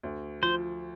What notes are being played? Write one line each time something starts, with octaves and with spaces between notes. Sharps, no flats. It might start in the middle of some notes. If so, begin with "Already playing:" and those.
D2
F3 C5